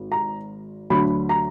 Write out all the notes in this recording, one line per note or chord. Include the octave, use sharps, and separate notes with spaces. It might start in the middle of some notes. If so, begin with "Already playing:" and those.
Already playing: G#1
A#5
D2 D3 F#3 B5
A#5